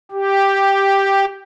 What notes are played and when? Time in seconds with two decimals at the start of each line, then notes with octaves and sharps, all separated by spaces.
0.11 G4